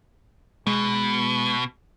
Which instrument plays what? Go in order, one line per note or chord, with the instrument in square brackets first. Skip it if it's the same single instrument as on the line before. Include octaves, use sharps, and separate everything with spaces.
[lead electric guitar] B2 [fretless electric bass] G#3